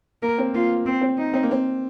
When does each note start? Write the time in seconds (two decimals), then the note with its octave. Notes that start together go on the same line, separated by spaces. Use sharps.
0.22 A#3 A#4
0.38 C4
0.54 A#3 F4
0.86 C4
1.01 C4
1.18 D#4
1.34 C4
1.43 A#3
1.51 C4